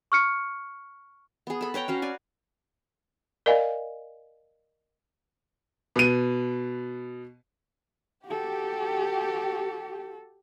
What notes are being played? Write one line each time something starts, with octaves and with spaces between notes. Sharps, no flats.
C#6 F6 C#7
B3 G#4
A4 B5
B4 C#5 G5 A#5
C#4 F#4 F5
D5 G#5
A#4 D5 D#5 F5 G#5
B2 D#7
F#4 G4 A4